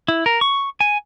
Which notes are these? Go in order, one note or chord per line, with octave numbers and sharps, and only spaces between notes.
E4
A#4
C#6
G#5